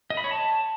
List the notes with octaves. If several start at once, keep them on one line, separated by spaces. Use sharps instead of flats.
D#5
B5
C#5
A5